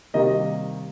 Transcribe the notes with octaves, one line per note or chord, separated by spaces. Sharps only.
C3 D#3 G3 A#3 D#5